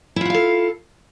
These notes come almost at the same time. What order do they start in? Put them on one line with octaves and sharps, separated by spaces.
E4 F4 F#5 F5 A4